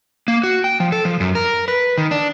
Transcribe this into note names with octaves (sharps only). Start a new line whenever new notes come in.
A#3
F#4
G5
F3
A4
F3
F#2
A#4
B4
D#3
D4